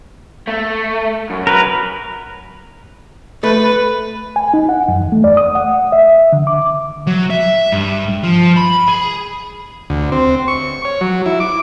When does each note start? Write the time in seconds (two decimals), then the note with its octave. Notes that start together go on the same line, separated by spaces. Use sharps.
0.47 A3
1.30 F#2
1.47 A#4 B4
3.43 A3 B4
4.36 G#5
4.54 D#4
4.69 F#5
4.88 F#2
5.01 E2
5.12 A3
5.24 D5
5.37 D#6
5.55 F#5
5.92 E5
6.33 D3
6.47 D6
7.07 F#3
7.30 E5
7.72 G2
8.23 F3
8.56 B5
8.88 G#4
9.90 D2
10.12 C4
10.48 C#6
10.85 C#5
11.01 F#3
11.26 E4
11.40 D6